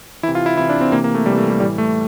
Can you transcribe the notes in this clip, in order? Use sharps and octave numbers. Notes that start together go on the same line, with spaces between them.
C3 E3 E4
F4
E4
C3 E3 E4
D4
C4
C3 E3 A#3
A#3
A3
C3 E3 G3
A3
G3
A2 E3 G3
A3